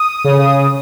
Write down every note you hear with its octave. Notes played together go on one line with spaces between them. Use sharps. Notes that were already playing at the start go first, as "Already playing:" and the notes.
Already playing: D#6
C#3